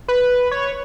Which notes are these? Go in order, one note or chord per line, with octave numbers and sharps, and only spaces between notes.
B4
C#5